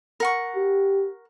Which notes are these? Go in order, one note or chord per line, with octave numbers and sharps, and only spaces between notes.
A#4 F#5 C#6
G4